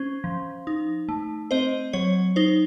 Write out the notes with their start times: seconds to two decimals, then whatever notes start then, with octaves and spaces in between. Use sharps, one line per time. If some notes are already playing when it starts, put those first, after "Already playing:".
Already playing: C#4 C5
0.24 F3
0.67 D#4
1.09 A3
1.51 C4 C5 D#5
1.93 F#3 C#5
2.36 D#4 C5